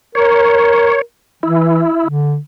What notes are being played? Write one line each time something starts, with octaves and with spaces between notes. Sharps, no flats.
A#4 C#5
E3 E4
D3